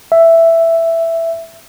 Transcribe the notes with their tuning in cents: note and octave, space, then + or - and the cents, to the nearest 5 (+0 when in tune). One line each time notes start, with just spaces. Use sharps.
E5 +5